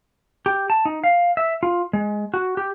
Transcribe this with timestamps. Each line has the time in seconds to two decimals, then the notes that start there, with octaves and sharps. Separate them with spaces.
0.46 G4
0.70 A5
0.85 D#4
1.04 F5
1.37 E5
1.63 F4
1.93 G#3
2.34 F#4
2.57 G4